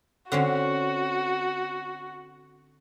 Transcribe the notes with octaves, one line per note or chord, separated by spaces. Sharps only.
D3 C4 C#4 F#4